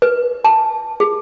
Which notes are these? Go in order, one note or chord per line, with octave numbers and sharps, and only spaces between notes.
B4
A5
G#4